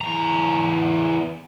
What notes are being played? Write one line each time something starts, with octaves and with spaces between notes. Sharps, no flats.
E2 A#5